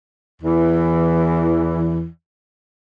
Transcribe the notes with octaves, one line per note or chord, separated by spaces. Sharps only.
E2 E3